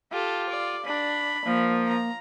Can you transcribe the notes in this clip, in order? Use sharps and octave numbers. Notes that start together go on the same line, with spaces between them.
F4 G4 A4
D5
D4 B5
F3 A#3
A#5